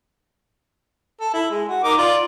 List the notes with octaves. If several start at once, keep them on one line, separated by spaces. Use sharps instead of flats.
A4
E4
G#3
F#4
D#4 A#4 D6
F4 D5